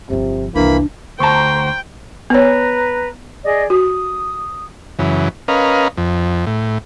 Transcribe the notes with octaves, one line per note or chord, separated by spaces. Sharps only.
G1 C3 F3
C2 F2 E3 A#3 D4 B5
D2 C5 G5 A5 A#5 C#6
B3 B4 C#5 A#5
G#4 D5 D#5
F#4 D#6
F#2 C#3 E3
C#4 A#4 B4 D#5 F5
F2
A2